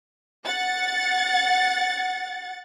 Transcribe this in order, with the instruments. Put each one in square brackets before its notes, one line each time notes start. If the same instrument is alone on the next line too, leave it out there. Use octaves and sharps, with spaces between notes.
[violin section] F#5 A6